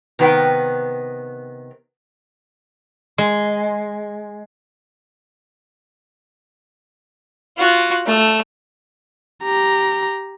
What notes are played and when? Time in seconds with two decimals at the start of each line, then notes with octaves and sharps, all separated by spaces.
0.19 C3 D#3 B3 B4 G5
3.18 G#3
7.58 F4 F#4
8.06 A3 E6
9.44 G4 A#5